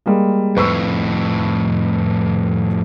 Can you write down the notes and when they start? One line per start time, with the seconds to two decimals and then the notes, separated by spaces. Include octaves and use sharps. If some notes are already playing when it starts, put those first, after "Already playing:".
0.06 G3 G#3 A#3
0.57 F2 A2 B4 C#6 E6